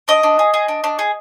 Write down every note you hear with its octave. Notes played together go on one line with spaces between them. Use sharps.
D4 D#5
D4
G#4
G#4
D4
D4
G#4